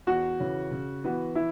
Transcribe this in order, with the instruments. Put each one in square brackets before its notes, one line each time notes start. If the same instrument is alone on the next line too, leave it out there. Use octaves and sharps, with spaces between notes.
[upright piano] E2 [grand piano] F#4
[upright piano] C#3 E3 C#4
C#3
E3 B3 F#4
[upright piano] E3 [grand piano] E4